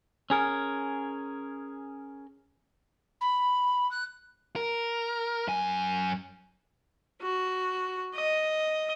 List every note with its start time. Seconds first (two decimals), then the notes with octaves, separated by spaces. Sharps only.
0.30 C#4 G#4 A#4
3.21 B5
3.91 F#6
4.56 A#4
5.48 F#2 G#5
7.22 F#4
8.16 D#5